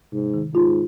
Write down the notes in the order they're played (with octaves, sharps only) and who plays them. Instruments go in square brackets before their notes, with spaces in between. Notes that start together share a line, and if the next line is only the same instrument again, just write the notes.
[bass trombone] G#2 [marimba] C3
[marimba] D#3
[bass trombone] G#2 [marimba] F4